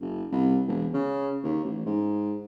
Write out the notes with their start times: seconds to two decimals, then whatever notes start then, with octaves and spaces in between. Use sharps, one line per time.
0.01 F#1
0.32 C2
0.68 E1
0.94 C#3
1.44 D#2
1.65 A1
1.86 G#2